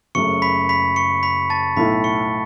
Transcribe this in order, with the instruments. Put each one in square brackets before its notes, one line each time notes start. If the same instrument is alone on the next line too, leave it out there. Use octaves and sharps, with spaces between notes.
[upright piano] F#1 F#2 C#3 A3 [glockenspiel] C#6 C#7
[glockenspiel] B5 B6
B5 B6
C#6 C#7
B5 B6
A5 A6
[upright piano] B1 A2 A3 E4 [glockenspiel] B5 B6
[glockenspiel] C#6 C#7